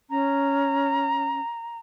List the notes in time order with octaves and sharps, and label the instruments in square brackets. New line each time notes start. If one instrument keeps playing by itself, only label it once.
[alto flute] C#4 [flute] A#5